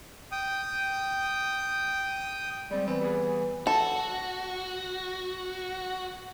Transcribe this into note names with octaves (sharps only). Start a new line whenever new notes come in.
G5 D#6
G3 G#3 C4
E3 B3 C4
G3 B3 G#4
F#4 A4